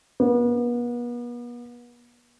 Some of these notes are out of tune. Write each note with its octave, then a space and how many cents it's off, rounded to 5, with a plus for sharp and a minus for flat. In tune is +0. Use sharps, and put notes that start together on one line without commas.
B3 -40